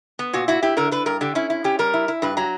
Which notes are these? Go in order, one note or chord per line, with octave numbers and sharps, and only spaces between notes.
B3
A#2 F#4
E4 F#4
E4 G4
D3 A#4
D3 B4
G2 A#4
D3 G4
C#4 E4
E4
C#4 G4
G3 A#4
E4
E4
G2 B4
F#3 A#5